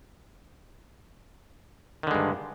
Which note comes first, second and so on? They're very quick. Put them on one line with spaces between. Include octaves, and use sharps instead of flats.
D#3 D3 G#3 G2